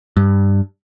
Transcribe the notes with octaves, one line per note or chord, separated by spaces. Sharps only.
G2